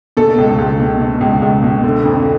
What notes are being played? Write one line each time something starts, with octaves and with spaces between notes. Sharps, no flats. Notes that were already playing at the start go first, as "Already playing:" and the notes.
B2 A4
C#2
C#2
B2
B2
C#2
C#2
B2
D3
F2